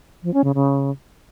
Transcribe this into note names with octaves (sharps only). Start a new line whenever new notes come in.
F3
C#4
C#3
C#3